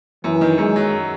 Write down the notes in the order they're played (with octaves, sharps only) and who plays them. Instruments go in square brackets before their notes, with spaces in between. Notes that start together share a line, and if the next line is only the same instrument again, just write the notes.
[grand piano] F#2 [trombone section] E3
[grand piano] D#3
[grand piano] F#2 [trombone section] G#3
[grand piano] F#3